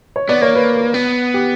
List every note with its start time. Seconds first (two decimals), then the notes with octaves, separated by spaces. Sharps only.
0.16 C#5
0.29 B3 D5
0.41 A#3 C#5
0.55 B4
0.74 B4
0.94 B3
1.34 G4